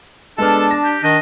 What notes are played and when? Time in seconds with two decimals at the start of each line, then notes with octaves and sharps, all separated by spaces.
0.38 G#3 B3 D4 A4 A5 F6
0.70 A#6
0.84 G4
1.03 D#3 D4 D#5